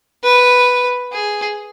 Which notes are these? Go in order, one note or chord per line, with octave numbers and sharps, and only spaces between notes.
B4
G#4